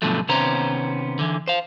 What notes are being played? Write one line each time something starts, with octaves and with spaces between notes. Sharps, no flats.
G2 B2 D3 F3 F#3 A3
C3 D#3 B3 C#4 C5 A#5
D3 E3
C5 F5